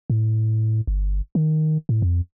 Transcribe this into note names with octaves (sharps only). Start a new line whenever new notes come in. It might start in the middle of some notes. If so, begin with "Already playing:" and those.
A2
G1
D#3
A2
F2